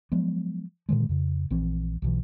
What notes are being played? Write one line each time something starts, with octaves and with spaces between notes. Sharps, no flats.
F3 F#3 G#3 B3
A#2 D3 D#3 G#3
F2 C#3
A#1 E3 C4
B1 B2 E3